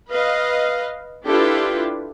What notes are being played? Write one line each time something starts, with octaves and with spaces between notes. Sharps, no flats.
B4 D#5 F5
D4 E4 F4 G4 A4 B4